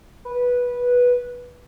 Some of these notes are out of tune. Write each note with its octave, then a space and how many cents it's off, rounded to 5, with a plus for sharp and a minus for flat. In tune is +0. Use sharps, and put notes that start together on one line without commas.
B4 -10